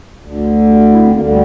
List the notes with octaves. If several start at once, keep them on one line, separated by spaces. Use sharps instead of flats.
D2 D3
G3
A3
E4
C4
D2 D3 A#3
G3